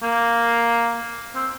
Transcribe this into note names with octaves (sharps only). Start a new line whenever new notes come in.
A#3
C4